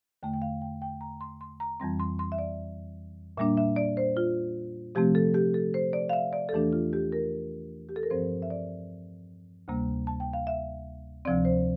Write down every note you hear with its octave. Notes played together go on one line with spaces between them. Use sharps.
E2 D3 A3 G5
G5
F5
G5
G5
A#5
C6
C6
A#5
F2 E3 G3 C4 C6
C6
C6
E5
D5
A#2 G3 A#3 D4 E5
E5
D5
C5
F4
C3 F3 A3 C4 G4
A4
G4
A4
C5
D5
F5
E5
D5
A4
E2 E3 A3 D4 G4
F4
G4
A#4
G4
A4
A#4
G2 F3 C4 C5
E5
D5
D2 C3 G3 A#3
A5
G5
F5
E5
D2 C3 F3 C4 D5
C5